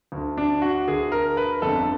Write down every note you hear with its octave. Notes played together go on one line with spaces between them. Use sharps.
D2
D3
D4
F#4
D2 D3 G#4
A#4
B4
G1 F2 D3 A4